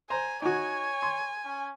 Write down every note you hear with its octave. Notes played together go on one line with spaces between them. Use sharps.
C5 G#5 A#5 C6
D#4 F#4 C#5 G#5
C6
C#4